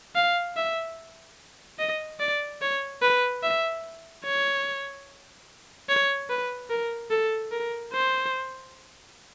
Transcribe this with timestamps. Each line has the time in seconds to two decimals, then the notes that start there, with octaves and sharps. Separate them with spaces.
0.15 F5
0.57 E5
1.79 D#5
2.20 D5
2.62 C#5
3.02 B4
3.43 E5
4.24 C#5
5.89 C#5
6.30 B4
6.70 A#4
7.11 A4
7.52 A#4
7.93 C5